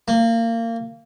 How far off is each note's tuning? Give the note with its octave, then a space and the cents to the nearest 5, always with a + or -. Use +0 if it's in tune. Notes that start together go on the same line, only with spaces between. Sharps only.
A#3 -25